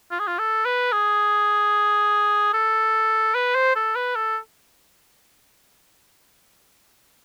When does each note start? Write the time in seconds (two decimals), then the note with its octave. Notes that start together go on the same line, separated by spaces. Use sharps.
0.11 F4
0.19 G#4
0.27 F4
0.39 A4
0.65 B4
0.92 G#4
2.54 A4
3.35 B4
3.55 C5
3.75 A4
3.96 B4
4.16 A4